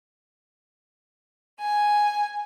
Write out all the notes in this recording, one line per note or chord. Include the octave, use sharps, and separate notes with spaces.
G#5